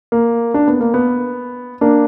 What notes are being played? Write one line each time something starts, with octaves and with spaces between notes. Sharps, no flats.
A#3
D4
B3
A#3
B3
A#3 D4